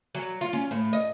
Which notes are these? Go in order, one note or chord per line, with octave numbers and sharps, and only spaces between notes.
F#3
F4
C#4
A2
D#5